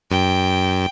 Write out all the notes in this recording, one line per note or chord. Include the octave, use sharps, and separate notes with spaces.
F#2 G5